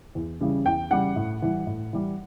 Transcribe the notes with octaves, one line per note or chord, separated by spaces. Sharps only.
E2
C#3 E3 G3
E2 G5
C#3 E3 G3 F#5
A2
E3 G3
A2
E3 G3